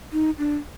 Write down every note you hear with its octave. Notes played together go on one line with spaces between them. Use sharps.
D#4
D4